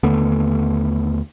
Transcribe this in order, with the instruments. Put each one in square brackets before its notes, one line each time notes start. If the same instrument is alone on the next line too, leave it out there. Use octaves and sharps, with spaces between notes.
[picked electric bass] D#2 D3 A3 B3